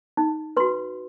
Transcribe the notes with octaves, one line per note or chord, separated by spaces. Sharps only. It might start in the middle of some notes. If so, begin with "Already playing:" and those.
D#4
F#4 B4 C6